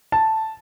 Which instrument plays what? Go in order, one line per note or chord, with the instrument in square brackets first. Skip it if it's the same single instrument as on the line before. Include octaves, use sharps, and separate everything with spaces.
[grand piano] A5